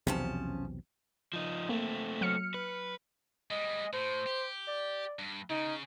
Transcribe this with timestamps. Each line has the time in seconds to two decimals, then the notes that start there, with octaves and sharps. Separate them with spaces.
0.07 B1 E2 C3 F3 C#4 A5
1.33 F3 D#4
1.69 A3 A#3 C4
2.21 F#3 F6 C#7
2.54 B4
3.51 G3 G#3 D#5
3.93 A2 C5
4.26 G4
4.68 D5
5.19 G2
5.50 C#3 D#4